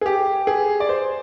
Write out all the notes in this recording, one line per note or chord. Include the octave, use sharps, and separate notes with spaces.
G#4
G4
G#4
D5
C5